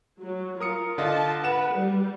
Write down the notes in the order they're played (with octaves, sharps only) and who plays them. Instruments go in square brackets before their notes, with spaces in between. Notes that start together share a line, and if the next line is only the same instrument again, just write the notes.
[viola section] F#3
[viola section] F4 [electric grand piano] A#4 D#6 C#7
[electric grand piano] D3 F4 D#5 [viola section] A5
[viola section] B4 [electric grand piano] F#5 E7
[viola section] G3